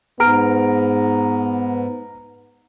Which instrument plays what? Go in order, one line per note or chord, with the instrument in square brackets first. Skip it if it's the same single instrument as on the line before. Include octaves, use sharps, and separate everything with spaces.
[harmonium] G#2 [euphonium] B3 [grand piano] A#5 F6 D7